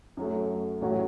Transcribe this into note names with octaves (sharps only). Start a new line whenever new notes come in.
F#2 F#3 A3
A1 A2 F#3 C#4 F#4